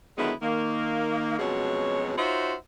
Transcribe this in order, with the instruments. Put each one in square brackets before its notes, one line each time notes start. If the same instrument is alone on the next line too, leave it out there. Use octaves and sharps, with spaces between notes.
[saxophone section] D3 D#3 F#3 G#3 B3 E4
D#3 A#3
F2 B2 F#3 G#3 C#4 C#5
D#4 F4 F#4 C5 C#5 E5